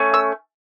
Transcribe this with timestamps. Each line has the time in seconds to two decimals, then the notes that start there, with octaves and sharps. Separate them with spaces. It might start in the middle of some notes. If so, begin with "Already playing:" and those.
Already playing: A3 C#4
0.14 E6